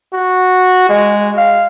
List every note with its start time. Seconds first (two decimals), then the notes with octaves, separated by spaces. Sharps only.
0.13 F#4
0.89 G#3
1.37 F5